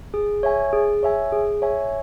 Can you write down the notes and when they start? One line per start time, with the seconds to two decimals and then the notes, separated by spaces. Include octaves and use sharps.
0.14 G#4
0.43 C#5 E5 G#5
0.73 G#4
1.03 C#5 E5 G#5
1.32 G#4
1.62 C#5 E5 G#5